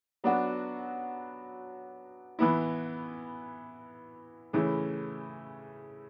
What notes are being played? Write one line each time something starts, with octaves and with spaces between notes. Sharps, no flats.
F#3 B3 D4 F#4
E3 B3 E4
C#3 E3 A3 C#4 E4